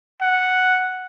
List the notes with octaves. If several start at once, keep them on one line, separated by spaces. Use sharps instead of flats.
F#5